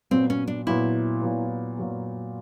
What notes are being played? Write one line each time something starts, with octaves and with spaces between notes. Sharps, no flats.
A#2 F#3 B3 C4
C#4
D4
A#2 F#3 B3 E4
A#2 F#3 B3
A#2 F#3 B3